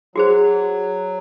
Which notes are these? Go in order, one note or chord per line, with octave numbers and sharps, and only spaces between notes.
F#3 F#4 G#4 C5